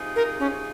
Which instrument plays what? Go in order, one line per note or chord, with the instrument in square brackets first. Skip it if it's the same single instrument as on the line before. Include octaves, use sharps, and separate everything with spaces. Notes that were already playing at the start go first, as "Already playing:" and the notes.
Already playing: [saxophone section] C3 F3 G#3 D#4 G#4
[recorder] A#4
C#4